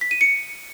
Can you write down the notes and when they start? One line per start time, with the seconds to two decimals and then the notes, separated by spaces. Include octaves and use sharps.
0.01 B6
0.11 D#7
0.21 C#7